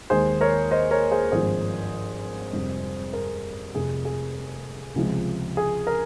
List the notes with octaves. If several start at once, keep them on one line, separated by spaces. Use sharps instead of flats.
D#2 D#3 G#3 G#4 C5
A#4 C#5
C5 D#5
A#4 C#5
G#4 C5
G#1 G2 F3 G#3 G#4 C5
F2 C3 G3
A#4
F1 F2 C3 G#4
G#4
C#2 C3 F3 G#3
G#4
A#4